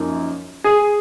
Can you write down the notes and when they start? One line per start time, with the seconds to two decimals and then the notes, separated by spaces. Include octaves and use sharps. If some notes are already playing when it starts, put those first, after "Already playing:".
Already playing: F#2 F3 A#3 D#4
0.64 G#4